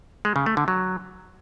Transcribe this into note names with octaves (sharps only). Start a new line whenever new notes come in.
G#3
C#3
A3
D3
F#3